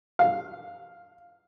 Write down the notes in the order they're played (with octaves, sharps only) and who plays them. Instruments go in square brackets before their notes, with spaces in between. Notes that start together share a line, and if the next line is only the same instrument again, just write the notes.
[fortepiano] F5